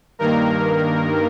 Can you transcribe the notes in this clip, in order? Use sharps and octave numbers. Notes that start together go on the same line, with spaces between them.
G2 D#3 A#3 A#4